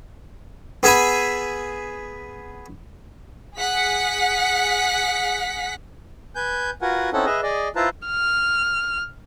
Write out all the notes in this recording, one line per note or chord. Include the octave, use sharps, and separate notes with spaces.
B3 G#4 E5 G#5 B5
G#4 F#5 B6
B4 G#5 G6
F4 F#4 A#4 B4 F#5 G#5
C4 C#4 D#4 E4 A4 F#5
G#4 B4 D#5 E5
G#4 D5 D#5
E4 F4 B4 C5 A5 A#5
F6